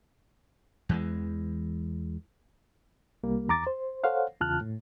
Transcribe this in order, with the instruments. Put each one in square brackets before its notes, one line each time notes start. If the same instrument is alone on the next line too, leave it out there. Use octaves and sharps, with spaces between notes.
[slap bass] E2 E3 G#3
[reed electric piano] C2 G3 A#3
E2 A#5 D6 A6
C5
A4 C5 C#5 F5 F#5
E2 C#3 F4 A5 F6 F#6
A2